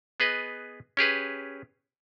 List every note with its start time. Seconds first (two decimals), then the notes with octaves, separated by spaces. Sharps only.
0.20 B3 G#4 B4 D#5
0.97 C#4 G4 G#4 B4